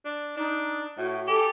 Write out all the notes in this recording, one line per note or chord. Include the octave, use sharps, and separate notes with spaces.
D4
D4 D#4
A2 F#4
G4 A4 G#5